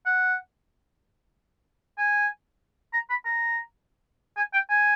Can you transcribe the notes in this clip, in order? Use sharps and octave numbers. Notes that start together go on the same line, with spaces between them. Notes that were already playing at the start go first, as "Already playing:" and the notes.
F#5
G#5
A#5
B5
A#5
G#5
G5
G#5